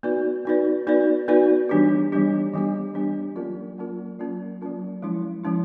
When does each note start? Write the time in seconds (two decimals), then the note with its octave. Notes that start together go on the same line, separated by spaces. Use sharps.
0.03 B3 D#4 F#4 B4 D5
0.45 B3 D#4 F#4 B4 D5
0.87 B3 D#4 F#4 B4 D5
1.28 B3 D#4 F#4 B4 D5
1.69 E3 G3 B3 D4 G4
2.12 E3 G3 B3 D4 G4
2.54 E3 G3 B3 D4 G4
2.94 E3 G3 B3 D4 G4
3.36 F#3 A#3 C#4 F4 A#4
3.78 F#3 A#3 C#4 F4 A#4
4.19 F#3 A#3 C#4 F4 A#4
4.61 F#3 A#3 C#4 F4 A#4
5.02 F3 G#3 C#4 E4
5.44 F3 G#3 C#4 E4